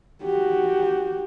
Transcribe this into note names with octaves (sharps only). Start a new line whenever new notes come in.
F#4 G4